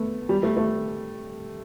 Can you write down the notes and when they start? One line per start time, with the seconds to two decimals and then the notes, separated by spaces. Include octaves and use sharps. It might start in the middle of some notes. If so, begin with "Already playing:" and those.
Already playing: A3 B3
0.29 G3
0.43 A3
0.57 A3